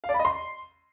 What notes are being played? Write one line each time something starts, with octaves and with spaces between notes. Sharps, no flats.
F5
D5
B5
D#5
C6